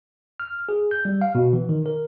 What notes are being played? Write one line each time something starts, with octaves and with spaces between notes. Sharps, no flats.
F6
G#4
G6
G3
F5
B2
E3
D#3
A#4